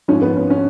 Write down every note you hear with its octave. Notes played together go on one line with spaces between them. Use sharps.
G#2 F3 C#4
B3
C#4
C#4